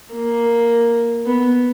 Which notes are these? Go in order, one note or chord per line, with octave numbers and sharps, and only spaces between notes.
A#3
B3